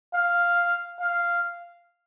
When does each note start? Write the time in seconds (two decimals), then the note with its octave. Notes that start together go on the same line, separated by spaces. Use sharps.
0.15 F5
1.00 F5